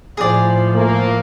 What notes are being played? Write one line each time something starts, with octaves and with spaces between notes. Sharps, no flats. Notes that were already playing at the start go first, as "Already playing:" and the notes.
A2 F3 G#4 D5
A3 A#3